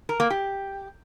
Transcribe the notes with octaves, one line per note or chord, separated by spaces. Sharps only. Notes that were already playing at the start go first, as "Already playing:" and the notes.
A#4
A#3
G4